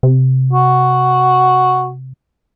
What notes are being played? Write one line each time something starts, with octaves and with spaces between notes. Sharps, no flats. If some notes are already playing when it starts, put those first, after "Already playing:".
C3
F#4